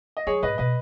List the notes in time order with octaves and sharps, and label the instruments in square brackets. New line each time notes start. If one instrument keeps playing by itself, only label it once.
[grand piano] D#5
[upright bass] F#3 [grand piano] G#4 C#5
[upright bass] G#2 [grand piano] B4 D#5
[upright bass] B2 [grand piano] B4 D#5